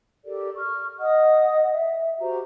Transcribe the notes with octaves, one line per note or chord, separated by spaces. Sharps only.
G4 A4 A#4 D5
C#6 F6
D#5 F#5 D#6
E5
F#4 G4 C5 A#5